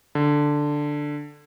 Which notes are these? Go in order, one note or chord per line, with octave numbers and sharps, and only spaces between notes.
D3